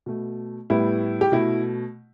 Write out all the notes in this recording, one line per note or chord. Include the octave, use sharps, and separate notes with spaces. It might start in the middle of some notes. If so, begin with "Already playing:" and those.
B2 A3
A2 G3 B3 E4
G4
B2 A3 E4